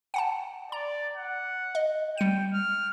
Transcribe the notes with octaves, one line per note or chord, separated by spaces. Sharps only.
F#5 G5 A5
D5 A#5
F#5
D#5
G3 G5 C#7 D#7
F6